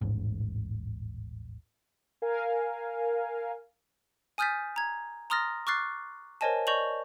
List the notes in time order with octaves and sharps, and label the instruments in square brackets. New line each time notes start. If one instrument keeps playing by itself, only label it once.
[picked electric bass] D#1 A1 G#2
[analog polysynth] A#4 F5 G#5
[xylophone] G#5 D#6 F6 G6 A6 B6
A#5 G#6
A#5 C6 D#6 F6 A6 A#6
C#6 D6 F6 F#6 A6 C7
A#4 C5 C#5 D#5 G#5 A5
D5 D#5 C#6 G6 F7 F#7